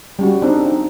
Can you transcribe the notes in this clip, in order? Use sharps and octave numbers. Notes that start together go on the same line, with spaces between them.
G3 C#4 F#4
C4 D4 D#4
D#4